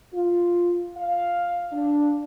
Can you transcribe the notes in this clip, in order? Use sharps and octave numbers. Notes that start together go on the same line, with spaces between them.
F4
F5
D4